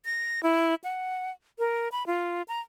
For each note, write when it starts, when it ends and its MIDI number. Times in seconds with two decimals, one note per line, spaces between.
0.05 0.42 94
0.43 0.75 64
0.84 1.31 78
1.59 1.88 70
1.92 2.06 83
2.07 2.42 65
2.48 2.60 82